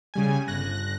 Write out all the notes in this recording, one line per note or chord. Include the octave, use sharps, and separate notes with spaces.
C#3 G3 G#5
G1 F#6 A#6